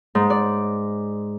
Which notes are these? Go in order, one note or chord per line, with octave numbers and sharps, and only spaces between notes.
G#2
D5